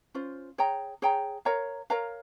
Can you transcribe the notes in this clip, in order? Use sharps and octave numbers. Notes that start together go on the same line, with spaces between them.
C#4 F4 C5
G#4 C#5 G5 A#5
G#4 C#5 G5 A#5
A#4 C#5 F5 A#5
A#4 C#5 F5 A#5